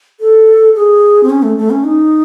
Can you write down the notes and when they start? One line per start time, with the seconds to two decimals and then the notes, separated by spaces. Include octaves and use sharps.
0.20 A4
0.76 G#4
1.23 C4
1.30 C#4
1.43 A3
1.57 A3
1.70 C#4
1.84 D#4